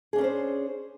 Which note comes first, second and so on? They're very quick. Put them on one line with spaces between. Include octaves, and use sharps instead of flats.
G#4 D4 C#4 B4 C5